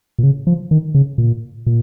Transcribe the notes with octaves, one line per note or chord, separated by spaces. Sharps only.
A#2
C#3
F3
D#3
C#3
A#2
A#2